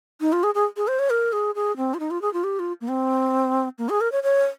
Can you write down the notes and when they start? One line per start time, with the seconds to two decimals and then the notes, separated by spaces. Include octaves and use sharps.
0.21 D#4
0.33 F4
0.43 G#4
0.55 G#4
0.77 G#4
0.88 C5
0.99 C#5
1.10 A#4
1.33 G#4
1.55 G#4
1.77 C4
1.94 F4
2.00 D#4
2.11 F4
2.22 G#4
2.33 F4
2.44 G4
2.59 F4
2.81 A#3
2.88 C4
3.78 A#3
3.89 G#4
4.01 A#4
4.12 C#5
4.23 C#5